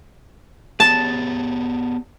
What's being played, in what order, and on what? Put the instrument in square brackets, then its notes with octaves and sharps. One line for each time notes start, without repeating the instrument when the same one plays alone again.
[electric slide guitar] B3 G4 G#4 [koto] A5